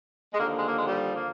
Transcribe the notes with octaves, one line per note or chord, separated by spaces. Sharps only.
G#3
D#2 D3 F3 A#3
G#3
A#3
G#3
G3
A#3